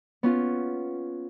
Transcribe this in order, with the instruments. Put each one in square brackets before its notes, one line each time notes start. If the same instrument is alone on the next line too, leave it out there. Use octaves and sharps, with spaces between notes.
[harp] B3 C#4 F4